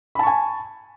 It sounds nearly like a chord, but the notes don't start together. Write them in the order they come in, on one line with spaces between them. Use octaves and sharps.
B5 A5 C#6 G#5